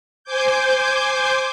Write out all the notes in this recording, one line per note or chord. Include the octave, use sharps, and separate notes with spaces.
C5 G#5 D6 G6